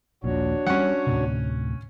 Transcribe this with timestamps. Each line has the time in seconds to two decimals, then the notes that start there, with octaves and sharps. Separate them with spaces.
0.24 D#1 A#1 A#2 D4 F#4 C#5
0.67 F#3 G3 C#4 F#5
1.07 D2 A2 C3